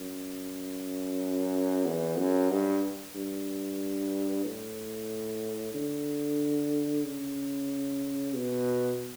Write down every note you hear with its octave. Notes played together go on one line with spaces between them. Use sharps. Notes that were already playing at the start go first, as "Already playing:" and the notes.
Already playing: F#2
E2
F#2
G2
G2
A2
D3
C#3
B2